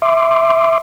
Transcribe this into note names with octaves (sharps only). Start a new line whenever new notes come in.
E5 C6 D6